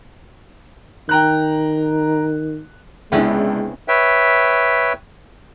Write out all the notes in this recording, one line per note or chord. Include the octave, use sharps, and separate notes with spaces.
D#3 G5 A#5 F#6
C#2 C3 G#3 B3 C#4 D4 E4
B4 C#5 E5 G5